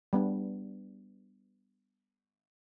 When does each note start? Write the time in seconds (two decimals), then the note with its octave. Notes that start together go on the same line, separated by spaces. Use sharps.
0.13 G3 B3 D4